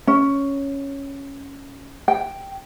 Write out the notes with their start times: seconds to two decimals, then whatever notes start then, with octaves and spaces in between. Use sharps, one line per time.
0.07 C#4
2.08 G5